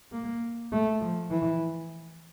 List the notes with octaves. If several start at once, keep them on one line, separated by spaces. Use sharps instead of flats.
A#3
A3
F3
E3